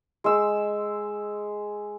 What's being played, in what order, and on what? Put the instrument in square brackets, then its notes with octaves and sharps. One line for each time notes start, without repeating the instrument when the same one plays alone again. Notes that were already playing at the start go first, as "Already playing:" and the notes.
[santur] G#3 E6